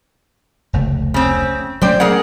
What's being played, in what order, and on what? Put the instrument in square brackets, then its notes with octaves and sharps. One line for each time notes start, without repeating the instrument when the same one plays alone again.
[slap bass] F1 C#2 A3
[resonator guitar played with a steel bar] C#3 C4
[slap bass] F#3 A3 C#4 [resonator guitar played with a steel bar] C5 D5 G5
[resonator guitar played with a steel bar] G#4 A#4 F#5